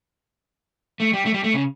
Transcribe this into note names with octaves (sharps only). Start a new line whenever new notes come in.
A3
G3
A3
G3
A3
C#3